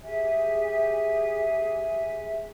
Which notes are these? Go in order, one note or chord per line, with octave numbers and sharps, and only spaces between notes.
G4 G#4 E5 G#5